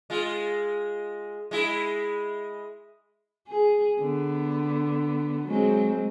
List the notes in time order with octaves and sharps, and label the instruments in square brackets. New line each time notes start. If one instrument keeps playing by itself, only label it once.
[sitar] G#3 F4
G#3 E4
[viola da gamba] G#4
D3 B3
F#3 G#3 C4